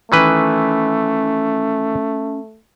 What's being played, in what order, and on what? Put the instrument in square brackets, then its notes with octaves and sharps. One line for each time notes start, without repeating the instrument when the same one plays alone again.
[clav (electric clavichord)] D#3 E3 B4 [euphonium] A3 [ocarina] C#4